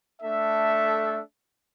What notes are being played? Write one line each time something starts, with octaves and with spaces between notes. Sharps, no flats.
A3 D4 A4 E5